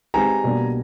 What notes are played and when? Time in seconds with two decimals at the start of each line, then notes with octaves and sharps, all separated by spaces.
0.14 G#3 C4 D#4 G4 B4 G#5 A#5
0.44 B2 G3 A#3 D4